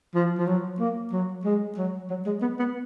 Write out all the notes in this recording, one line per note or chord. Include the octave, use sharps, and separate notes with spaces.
F3
F3
F#3
A#3
F#3
G#3
F#3
F#3
G#3
B3
B3